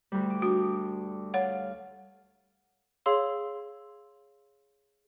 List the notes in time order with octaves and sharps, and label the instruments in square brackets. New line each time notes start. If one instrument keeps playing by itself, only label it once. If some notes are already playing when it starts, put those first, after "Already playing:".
[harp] D2 G3
D6
[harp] D4 [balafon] F#4
[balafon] C#5 F#5 [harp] F5
[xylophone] G#4 C#5 F5 C6 E6